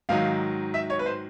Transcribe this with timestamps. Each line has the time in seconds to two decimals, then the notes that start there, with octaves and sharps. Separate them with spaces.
0.09 G#2 D#3 F#3 F5
0.74 E5
0.90 C#5
0.99 B4
1.06 C5